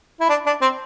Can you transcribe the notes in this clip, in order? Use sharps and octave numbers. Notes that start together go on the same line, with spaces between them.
E4
D4
D4
C4